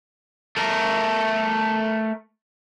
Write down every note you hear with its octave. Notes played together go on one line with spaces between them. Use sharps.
A3 A#4